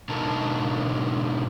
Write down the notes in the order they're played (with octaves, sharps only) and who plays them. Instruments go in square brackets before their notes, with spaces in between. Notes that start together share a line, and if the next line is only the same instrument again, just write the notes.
[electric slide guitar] G#2 B2 D3 D#4 A#4 A5